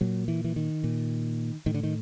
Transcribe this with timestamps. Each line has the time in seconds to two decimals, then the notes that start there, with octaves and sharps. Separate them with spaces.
0.01 A#2 F#3
0.28 E3
0.44 E3
0.56 D#3
0.84 A#2
1.66 A2 D#3
1.75 D3
1.83 D#3